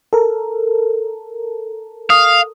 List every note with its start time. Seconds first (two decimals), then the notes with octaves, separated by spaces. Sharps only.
0.13 A4 A#4
2.10 F5 D#6